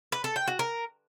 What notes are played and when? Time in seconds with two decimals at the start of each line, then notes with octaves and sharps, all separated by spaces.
0.12 B4
0.24 A4
0.36 G5
0.48 F#4
0.59 A#4